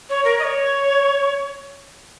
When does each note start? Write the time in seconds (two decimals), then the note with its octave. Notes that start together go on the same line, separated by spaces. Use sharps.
0.09 C#5
0.25 A#4
0.39 D#5
0.44 C#5